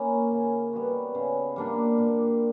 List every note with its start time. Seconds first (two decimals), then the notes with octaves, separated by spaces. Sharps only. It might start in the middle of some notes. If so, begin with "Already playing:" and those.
Already playing: A#3 C#4 E4
0.32 C#3
0.73 G3 B3 F#4
1.15 C#3
1.56 G3 A#3 D4
1.98 A#2